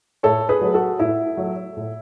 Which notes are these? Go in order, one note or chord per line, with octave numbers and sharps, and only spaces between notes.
A2 A4 C#5
G#4 B4
F#3 A3
F#4 A4
A2 E4
F#3 A3
A2